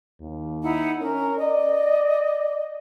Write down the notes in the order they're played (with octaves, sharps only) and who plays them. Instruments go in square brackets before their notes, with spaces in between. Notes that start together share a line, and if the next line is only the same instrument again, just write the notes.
[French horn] D#2
[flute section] D#4 E4 F#5
[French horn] C#4 [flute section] A#4
[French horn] D5 [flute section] D#5